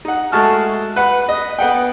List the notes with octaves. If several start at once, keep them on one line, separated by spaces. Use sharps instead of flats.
D#4 F#5
G#3 A3 F#4 A5 C#6 F6
B4 F#5
D#5
B3 F#5 G5